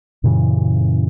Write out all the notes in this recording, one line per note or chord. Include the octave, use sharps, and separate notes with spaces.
F#2 A#2 C#3 E3